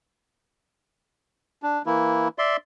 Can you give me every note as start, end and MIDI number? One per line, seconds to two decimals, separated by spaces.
1.63 1.82 62
1.86 2.28 52
1.86 2.28 58
1.86 2.28 64
2.38 2.57 74
2.38 2.57 76
2.38 2.57 84